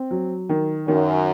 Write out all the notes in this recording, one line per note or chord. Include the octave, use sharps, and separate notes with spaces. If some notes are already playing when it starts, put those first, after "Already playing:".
Already playing: C4
F#3
D#3
F#2 D#3